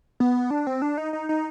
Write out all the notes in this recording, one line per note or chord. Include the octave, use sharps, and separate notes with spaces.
B3
D4
C4
D4
D#4
D#4
D#4